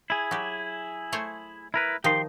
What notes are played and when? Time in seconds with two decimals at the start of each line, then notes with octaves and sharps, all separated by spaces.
0.10 E4 G#4
0.31 F#3 G4
1.12 A3 C5 C#5
1.74 E4 A#4 B4
2.04 D#3 F3 D#4 G4 C6